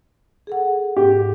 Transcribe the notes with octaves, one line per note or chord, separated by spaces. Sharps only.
G#4 A4 F#5
G#2 G4